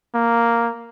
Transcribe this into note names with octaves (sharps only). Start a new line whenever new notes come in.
A#3